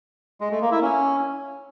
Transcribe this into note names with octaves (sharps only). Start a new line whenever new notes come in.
G#3
A3
A#3
E4
C#4